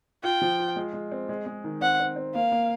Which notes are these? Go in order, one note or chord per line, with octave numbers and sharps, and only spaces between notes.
F4 G5
F3
F4
G#3
G#3
C4
G#3
G#3
D#3
C4 F#5
C4
C4
A#3 F5
A#3